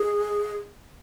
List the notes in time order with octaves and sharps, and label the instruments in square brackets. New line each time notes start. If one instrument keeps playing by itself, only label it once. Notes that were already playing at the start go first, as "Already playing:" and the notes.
Already playing: [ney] G#4